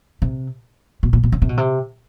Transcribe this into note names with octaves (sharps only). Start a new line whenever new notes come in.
C3
B2
A#2
B2
C#3
C3
B2
C3